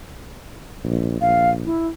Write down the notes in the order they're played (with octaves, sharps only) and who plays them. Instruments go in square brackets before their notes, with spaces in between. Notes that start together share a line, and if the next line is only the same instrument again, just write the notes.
[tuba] A#1
[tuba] A#1 [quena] F5
[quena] E4